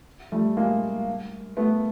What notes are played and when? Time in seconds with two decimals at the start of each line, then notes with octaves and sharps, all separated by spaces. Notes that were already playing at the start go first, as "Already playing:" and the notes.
0.32 G3 A3
0.57 G#3 A#3
1.57 A3 B3